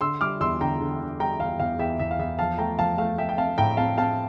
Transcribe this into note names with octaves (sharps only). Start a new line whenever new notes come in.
D3 C6 E6
G3 D6 F6
E2 C6 E6
D3 G5 A#5
D3
D3
G3 G5 A#5
E2 F5
E2 F5
E2 E5 G5
E2 E5
F5
E2 E5
F3 F5 A5
A3 G5 A#5
F3 F5 A5
A3 F5
A3 E5 G5
G5
C4 F5 A5
A2 G5 A#5
C4 F5 A5
C4 F5 A5